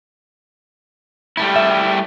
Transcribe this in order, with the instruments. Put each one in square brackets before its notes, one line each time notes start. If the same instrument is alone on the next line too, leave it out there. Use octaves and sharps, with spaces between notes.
[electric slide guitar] G3 A3 E4
[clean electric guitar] E5